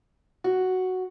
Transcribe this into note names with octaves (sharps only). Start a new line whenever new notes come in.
F#4